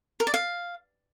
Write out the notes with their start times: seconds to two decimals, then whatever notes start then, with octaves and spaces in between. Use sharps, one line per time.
0.20 A#4
0.27 D5
0.34 F5